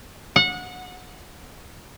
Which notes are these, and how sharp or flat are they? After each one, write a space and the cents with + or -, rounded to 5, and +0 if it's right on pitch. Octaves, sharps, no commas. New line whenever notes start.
F#5 -25